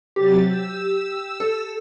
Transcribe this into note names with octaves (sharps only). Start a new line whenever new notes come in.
C3 F#3 G4 A6
E6
A4